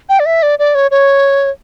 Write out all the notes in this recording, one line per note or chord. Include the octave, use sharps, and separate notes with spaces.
G5
D5
E5
D5
D5
C#5
C#5